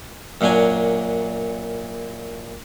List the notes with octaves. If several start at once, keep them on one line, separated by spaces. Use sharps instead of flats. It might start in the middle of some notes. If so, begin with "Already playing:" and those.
F#2 A#2 F#3 D4 G#5